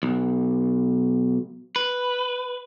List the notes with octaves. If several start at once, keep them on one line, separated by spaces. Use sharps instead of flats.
B1
B4